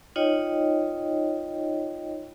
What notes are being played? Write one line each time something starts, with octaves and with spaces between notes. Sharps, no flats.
D#4 F4 C#5 D#5 G5